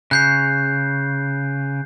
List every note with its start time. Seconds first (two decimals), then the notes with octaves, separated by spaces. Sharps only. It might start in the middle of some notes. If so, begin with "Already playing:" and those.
0.11 C#3 F#6 G6 C7